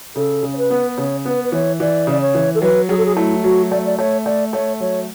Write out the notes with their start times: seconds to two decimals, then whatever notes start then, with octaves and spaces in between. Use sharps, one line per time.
0.16 C#3 A4
0.43 C#3
0.53 C#5
0.57 B4
0.70 B3
0.97 C#3 C#5
1.25 B3 B4
1.44 B4
1.52 E3 C#5
1.80 E3 D5
2.07 C#3 D5
2.21 C#5
2.34 E3
2.55 A4
2.62 F#3 B4
2.89 F#3 G#4
2.97 A4
3.05 G#4
3.16 A3 E4
3.43 F#3 F#4
3.71 A3 D5
3.85 D5
3.98 A3 C#5
4.25 A3 D5
4.53 A3 C#5
4.80 F#3 C#5